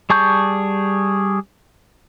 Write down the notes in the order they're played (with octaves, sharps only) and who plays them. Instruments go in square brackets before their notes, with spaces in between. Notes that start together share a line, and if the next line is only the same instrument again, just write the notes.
[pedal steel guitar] G3 G#4 A5 C#6 G6